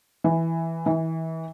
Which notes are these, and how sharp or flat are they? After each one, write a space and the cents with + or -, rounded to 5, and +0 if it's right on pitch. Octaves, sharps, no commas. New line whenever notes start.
E3 -5
E3 -30